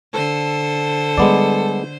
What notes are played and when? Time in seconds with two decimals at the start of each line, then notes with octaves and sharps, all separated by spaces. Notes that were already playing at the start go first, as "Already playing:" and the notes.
0.14 D3 A4 C5
1.18 G3 G#3 B3 D5